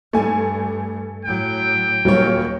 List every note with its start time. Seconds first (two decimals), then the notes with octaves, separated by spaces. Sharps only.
0.13 G2 A3 G#5
1.25 A2 F#3 G5
2.05 D#1 D#2 D#3 F#3 C#5